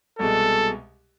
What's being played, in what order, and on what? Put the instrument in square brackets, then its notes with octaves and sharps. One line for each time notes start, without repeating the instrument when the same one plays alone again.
[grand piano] C2 B2 G#3 [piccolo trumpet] A4